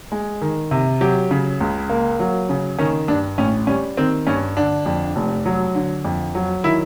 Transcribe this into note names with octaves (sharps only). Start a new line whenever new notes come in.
G#3
D#3
C3
F#3 G4
C#3
C#2
A#3
F#3
C#3
D#3 C#4
G2 D4
A1 C#4
G3 C#4
D#3 C4
G2 C#4
D3 D4
F2
F1
F#3
D3
F2
F#3
D#3 E4